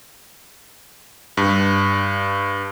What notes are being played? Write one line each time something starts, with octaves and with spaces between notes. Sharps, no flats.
G2